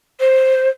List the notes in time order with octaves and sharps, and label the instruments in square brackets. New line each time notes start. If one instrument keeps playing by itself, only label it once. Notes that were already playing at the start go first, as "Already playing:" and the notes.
[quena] C5